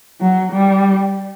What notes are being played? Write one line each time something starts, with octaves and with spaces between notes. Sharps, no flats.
F#3
G3